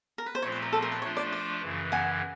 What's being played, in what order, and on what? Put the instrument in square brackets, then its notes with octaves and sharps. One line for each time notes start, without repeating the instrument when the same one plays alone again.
[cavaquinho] A#4
B4
C5
[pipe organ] A#2 F3 A3 C4 F4 [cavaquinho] C#5
[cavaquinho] B4
A#4
A4
A#4
B4
[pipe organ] F3 A3 D4 F4 [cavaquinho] C#5
[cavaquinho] D5
D5
[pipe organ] F#2 C#3 E3
[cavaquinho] F#5 G#5